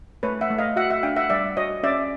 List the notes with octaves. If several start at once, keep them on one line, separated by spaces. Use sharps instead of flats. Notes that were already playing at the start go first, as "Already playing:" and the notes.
A3 B4 C#5
E5 F#5
A3
D#5 F5
F#4 E5 F#5
E5 F#5
D4 F5 G5
E5 F#5
G3 D5 E5
F#4 C#5 D#5
C#4 D5 E5